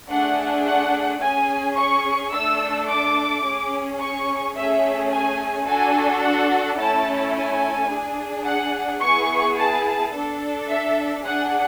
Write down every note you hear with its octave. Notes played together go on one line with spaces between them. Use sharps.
A3 D4 G#4 F#5
F#5
C#4 G#4 G#5
C#6
A3 D4 A4 E6
D6
C#4 G#4
C#6
A3 C#4 G#4 E5
G#5
D4 F#4 A4 G#5
F#5
A3 C#4 E4 A4 A5
G#5
D4 G#4
F#5
B3 E4 G#4 C#6
A5
D4 A4
E5
D4 G#4 F#5